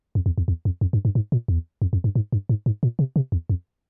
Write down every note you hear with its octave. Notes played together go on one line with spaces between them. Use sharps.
F2
E2
E2
E2
F2
F2
G2
G2
G#2
A#2
E2
F2
F2
G2
G#2
G2
G#2
G#2
A#2
C3
C3
E2
F2